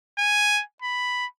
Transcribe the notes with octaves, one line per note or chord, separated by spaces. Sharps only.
G#5
B5